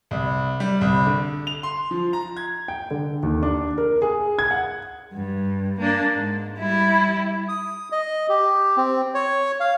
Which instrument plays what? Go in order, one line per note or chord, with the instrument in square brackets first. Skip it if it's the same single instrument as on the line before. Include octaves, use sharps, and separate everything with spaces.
[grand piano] C2
G3
C2
D3
F7
C6
F3
A#5
G#6
G5
D3
D#2
D4
A#4
G#4
G#6
F#5
[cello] G2
A#3 D4
G#2
G3 E4
[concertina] D#6
D#5
G4
C4
C#5
F5